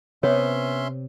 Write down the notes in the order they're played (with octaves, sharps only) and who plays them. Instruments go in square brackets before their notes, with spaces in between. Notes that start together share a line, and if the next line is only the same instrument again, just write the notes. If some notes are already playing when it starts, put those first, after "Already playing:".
[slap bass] C3 [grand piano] B3 [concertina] C#4 E5 C6 [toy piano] C#5